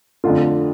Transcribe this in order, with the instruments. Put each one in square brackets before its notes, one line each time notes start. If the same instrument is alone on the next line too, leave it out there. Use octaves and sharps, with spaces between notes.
[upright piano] F2 D3 A3 F4